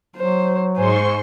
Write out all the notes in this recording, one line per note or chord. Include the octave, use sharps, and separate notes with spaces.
F#3 C5
G#2 C5 G#5 C6 C#6